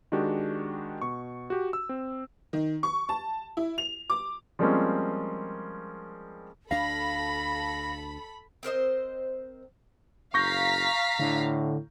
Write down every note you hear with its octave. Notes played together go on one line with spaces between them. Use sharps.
D#3 G#3 D4 F#4 G4
B2 C#6
F#4 G4
E6
C4
D#3
C#6
A5
E4
F7
D6
F3 G3 G#3 A#3 C4 C#4
D2 D4 A4 F5 B5 A#6
C4 A#4 C5 D#5
F#1 F5 A#5 C#6 G6 A#6 B6
A2 D3